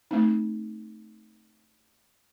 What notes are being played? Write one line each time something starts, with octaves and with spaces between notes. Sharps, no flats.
A3 C4 D#4